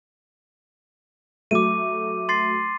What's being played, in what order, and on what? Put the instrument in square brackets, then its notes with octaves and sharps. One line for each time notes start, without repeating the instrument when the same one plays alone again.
[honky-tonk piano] F#3 A3 [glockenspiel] D6 D#7
[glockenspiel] C6 A6 C7